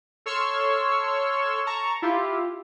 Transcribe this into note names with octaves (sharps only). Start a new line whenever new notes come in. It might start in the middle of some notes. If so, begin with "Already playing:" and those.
A4 C#5 C6 C#6 E6 F6
A5 A#5 C#6
E4 F4 G4